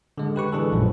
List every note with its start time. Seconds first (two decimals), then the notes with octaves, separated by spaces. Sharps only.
0.18 D3 G#3
0.36 G4 B4 C#6
0.53 E3 G#3 D4 G#4 A4
0.72 A#1 F#2 F3